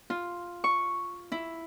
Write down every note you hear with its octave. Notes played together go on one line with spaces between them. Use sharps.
F4
C#6
E4